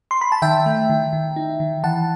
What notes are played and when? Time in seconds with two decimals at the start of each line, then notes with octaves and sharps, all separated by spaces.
0.11 C6
0.21 B5
0.32 A5
0.42 D#3 E5 G5
0.66 A3
0.90 D#3
1.13 D#3
1.36 D#4
1.60 D#3
1.84 E3 F#5 A5